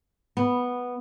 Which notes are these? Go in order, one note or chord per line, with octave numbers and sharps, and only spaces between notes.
B3